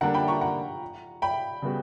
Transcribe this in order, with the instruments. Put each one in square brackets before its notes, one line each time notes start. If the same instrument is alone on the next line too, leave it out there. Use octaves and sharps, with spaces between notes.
[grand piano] D3 G3 A#3 D4 [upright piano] F#5 A#5
[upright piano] G5 B5
A#5 C#6
F#5 A#5
G5 B5
[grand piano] C#3 G3 B3 F#4